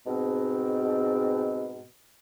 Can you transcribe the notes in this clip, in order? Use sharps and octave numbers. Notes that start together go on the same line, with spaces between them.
G#2 B2 C4